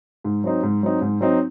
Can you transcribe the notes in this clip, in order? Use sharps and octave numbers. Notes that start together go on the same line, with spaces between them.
G#2
F#3 C4 D#4
G#2
F#3 C4 D#4
G#2
F#3 C4 D#4